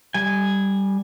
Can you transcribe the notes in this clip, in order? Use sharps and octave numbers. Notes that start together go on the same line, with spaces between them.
G3 G#5